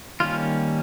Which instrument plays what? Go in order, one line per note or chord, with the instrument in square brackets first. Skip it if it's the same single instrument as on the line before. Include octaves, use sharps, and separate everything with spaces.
[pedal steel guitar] D#3 G3 A#3 C#4 F4